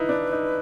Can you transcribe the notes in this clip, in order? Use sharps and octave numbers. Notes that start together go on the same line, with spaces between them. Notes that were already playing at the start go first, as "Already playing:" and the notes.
Already playing: D#4 E4 B4
D4
D#4